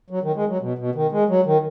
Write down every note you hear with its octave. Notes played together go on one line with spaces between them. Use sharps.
F#3
D#3
G#3
F#3
B2
B2
D#3
G#3
F#3
D#3